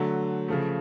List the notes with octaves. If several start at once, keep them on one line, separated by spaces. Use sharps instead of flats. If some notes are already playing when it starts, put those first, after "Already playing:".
Already playing: D3 F#3 A3
C#3 F3 A3